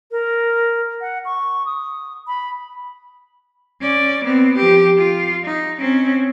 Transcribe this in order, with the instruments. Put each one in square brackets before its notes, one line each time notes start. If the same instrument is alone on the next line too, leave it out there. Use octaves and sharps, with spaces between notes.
[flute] A#4
F#5
C#6
D#6
B5
[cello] C#4 D5
B3 C4
F3 G4
F4
D#4
C4 C#4